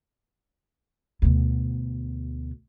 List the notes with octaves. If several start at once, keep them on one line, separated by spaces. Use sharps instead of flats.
D2 B2